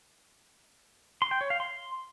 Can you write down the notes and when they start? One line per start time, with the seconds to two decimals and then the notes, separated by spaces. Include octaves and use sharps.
1.22 C6
1.31 G5
1.41 C#5
1.50 F5
1.60 C6